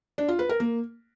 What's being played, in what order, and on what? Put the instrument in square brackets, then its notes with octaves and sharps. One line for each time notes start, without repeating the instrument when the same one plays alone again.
[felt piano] D4
F4
B4
A#4
A#3